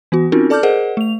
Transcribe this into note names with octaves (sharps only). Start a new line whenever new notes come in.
E3 B3 F#4
C4 C#4 D#4 F4 F#4 A#4
A4 D5 A5 D6 F6 G6
G#4 A#4 C5 D#5 F#5
A3 F7